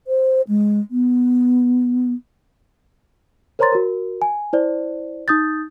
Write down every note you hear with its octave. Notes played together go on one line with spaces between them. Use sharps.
C5
G#3
B3
A#4 C5 C#5 A#5 C6 A6
F#4 A#4
G#5
E4 C5 D5
D#4 D#6 G6 A6